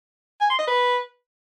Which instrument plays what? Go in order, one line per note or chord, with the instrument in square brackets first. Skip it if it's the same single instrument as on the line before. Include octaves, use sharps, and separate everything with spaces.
[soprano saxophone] G#5
C6
D#5
B4